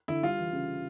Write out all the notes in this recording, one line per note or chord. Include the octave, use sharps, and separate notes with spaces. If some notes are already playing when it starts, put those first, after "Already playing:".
D3 E4
G3 F4
E3
C#3